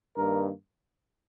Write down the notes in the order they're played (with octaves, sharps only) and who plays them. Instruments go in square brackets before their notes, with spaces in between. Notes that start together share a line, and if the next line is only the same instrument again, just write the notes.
[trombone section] G2 D#3 A#3 A#4